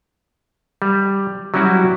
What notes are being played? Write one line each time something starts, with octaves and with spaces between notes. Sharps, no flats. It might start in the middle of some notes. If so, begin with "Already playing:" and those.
G3
F#3 G3 C#4 E4 F#4